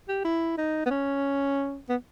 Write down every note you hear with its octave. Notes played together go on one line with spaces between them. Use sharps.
G4
E4
D#4
B3
C#4
B3